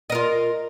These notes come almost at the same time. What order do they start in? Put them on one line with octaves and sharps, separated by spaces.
D#5 A#4 F4